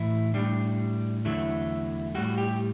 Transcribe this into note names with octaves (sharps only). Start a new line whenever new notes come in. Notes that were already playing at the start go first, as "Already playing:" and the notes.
Already playing: A2 E3 A3 E4
A2 G3 D4
E2 D3 F#3 A3 E4
A2 G3 F#4
G4